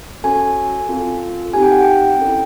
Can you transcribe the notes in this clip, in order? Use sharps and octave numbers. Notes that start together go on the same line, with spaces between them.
C#4 F#4 A4 G#5
C4 F4 A4
C4 D#4 G4 G#5
G5
F#5
G5
C#4 E4 A4